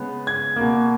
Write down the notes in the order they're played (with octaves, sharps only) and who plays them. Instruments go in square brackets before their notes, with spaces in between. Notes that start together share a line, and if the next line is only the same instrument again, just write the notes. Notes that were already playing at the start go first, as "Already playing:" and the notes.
Already playing: [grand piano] C#3 G#3 B3
G#6
B2 A#3